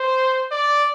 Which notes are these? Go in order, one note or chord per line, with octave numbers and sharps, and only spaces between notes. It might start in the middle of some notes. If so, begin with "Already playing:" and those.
Already playing: C5
D5